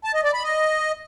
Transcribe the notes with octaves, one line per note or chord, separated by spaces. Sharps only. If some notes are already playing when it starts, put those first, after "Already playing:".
A5
D#5
D5
B5
D#5